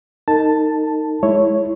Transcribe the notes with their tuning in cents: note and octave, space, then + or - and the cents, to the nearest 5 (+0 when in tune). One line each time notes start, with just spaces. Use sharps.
D#4 +0 A#4 -40 A5 +0
G#3 +0 E4 +0 C#5 +0